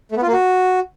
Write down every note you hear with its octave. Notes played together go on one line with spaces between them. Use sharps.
A3
B3
F4
A#3
F#4